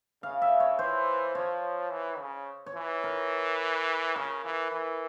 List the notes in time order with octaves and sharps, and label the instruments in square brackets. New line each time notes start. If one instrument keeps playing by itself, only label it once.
[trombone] C#3 [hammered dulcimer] F5
[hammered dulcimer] E5
C#5
[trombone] E3 [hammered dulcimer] C5
[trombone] F3 [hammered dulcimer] C#5
[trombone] E3
C#3
[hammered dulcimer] C#5
[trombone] E3
[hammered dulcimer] A#4
[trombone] C#3 [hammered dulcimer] A#4
[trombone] E3
E3